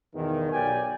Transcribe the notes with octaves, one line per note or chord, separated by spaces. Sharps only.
E2 G2 B2 D#3
B1 G4 D5 G5 G#5